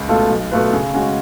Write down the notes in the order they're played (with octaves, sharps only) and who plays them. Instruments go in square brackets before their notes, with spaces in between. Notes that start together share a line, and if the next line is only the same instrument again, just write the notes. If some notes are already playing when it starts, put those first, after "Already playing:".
Already playing: [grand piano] C#2
B2 A3 F4 A4
B1
B2 A3 F4 B4
C#3
G#3 C#4 F#4